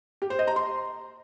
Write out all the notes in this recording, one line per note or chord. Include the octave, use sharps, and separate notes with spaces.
G4
C5
D#5
A#5
C6